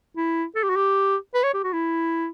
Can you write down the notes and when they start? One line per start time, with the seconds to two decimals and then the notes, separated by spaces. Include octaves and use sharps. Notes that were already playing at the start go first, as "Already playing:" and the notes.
0.17 E4
0.56 A4
0.63 G4
0.69 F#4
0.76 G4
1.34 B4
1.43 C#5
1.54 G4
1.64 F#4
1.73 E4